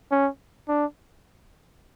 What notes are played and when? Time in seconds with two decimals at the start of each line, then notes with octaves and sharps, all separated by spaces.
0.11 C#4
0.68 D4